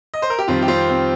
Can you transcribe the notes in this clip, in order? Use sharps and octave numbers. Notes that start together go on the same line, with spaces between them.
D#5
C5
A#4
G4
F2 D#3 G3 C4 F4
G4
C4 F4
C4